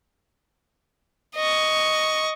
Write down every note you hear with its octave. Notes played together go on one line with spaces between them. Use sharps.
D#5 C#6